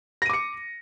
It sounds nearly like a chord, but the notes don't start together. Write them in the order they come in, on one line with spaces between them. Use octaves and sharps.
A#6 D#7 D6 C#7